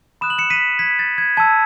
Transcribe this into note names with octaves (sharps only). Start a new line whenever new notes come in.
B5 D#6 F#6 E7
F#7
C#7 E7
B6 D#7
G#6 B6
A6
G#6
A5 E6 G#6